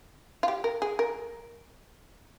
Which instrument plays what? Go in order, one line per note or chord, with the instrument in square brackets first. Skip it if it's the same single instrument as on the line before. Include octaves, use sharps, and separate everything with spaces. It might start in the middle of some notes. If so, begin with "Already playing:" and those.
[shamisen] F4
G4
A#4
G#4
A#4